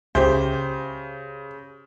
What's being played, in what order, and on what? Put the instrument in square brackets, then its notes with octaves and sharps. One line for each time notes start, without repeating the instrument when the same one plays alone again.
[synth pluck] C#2 [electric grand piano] C#3 [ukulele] G4 E5 [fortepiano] C5